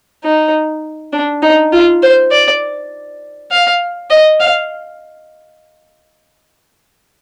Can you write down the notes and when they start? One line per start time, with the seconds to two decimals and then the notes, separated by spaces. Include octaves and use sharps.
0.24 D#4
1.13 D4
1.43 D#4
1.73 F4
2.03 C5
2.32 D5
3.51 F5
4.11 D#5
4.40 F5